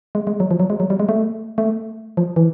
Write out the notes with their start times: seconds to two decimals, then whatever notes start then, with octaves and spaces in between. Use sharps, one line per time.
0.15 G#3
0.27 G#3
0.40 F#3
0.51 F3
0.60 F#3
0.70 G#3
0.80 F#3
0.90 G3
1.00 G#3
1.09 A3
1.58 A3
2.17 F3
2.36 E3